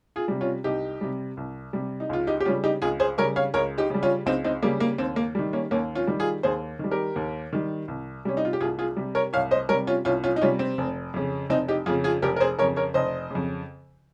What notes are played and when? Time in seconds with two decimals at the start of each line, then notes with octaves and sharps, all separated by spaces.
0.16 F4 G#4
0.28 C3 G3
0.41 C#4 F4
0.64 C2 D#4 G4
1.01 C3 G3
1.37 C2
1.73 C3 G3
2.00 D#4
2.09 C#2 F4
2.27 D#4 G4
2.41 G4
2.45 C#3 G3 C#4 F4
2.64 D#4 G4
2.82 C#2 F4 G#4
3.00 G#4 C5
3.18 C#3 G3 A#4 C#5
3.36 C#5 F5
3.54 C#2 A#4 C#5
3.78 D#4 G4
3.90 C#3 G3
4.03 C#4 F4
4.26 C#2 C4 D#4
4.44 C4 D#4
4.62 C#3 G3 A#3
4.80 A#3
4.98 D#2 C4
5.16 A#3
5.35 D#3 G3
5.53 A#3 C#4
5.71 D#2 A#3 C#4
5.95 C#4 F4
6.07 D#3 G3
6.20 F4 G#4
6.43 D#2 G#4 C5
6.79 D#3 G3
6.91 G4 A#4
7.16 D#2
7.53 D#3 G3
7.88 C2
8.25 C3 G3 C#4
8.37 D#4
8.45 F4
8.53 G4
8.60 C2 F4 G#4
8.79 F4 G#4
8.97 C3 G3
9.15 A#4 C#5
9.33 C2 C#5 F5
9.51 C5 D#5
9.69 G3 A#4 C#5
9.73 C3
9.87 C#4 F4
10.05 C2 C#4 F4
10.24 C#4 F4
10.36 D#4
10.41 C3 G3 C#4 F4
10.59 C4
10.78 F1
11.14 F2 C#3
11.50 F1 C4 D#4
11.68 D#4 G4
11.86 F2 C#3 F4 G#4
12.04 F4 G#4
12.22 F1 G4 A#4
12.36 A#4
12.40 G#4 C5
12.59 C#3 A#4 C#5
12.62 F2
12.76 A#4 C#5
12.94 F1 C5 D#5
13.31 F2 C#3